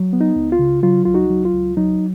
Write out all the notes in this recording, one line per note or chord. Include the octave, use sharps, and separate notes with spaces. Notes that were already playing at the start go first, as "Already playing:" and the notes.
Already playing: F#3
B3
D#4
C#2
F4
C#3
F#3 F4
C#2 F4
D#4 F#4
F#3
F4
C#2
F#3 D#4